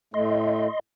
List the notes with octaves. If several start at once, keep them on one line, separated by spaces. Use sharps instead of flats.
A2 A3 D#5 C6